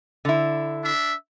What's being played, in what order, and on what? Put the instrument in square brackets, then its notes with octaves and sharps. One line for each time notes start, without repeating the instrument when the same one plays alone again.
[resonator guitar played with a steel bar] D3 E4
[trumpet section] D4 E5